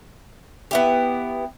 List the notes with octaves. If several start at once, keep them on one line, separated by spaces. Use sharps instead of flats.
B3 E4 G4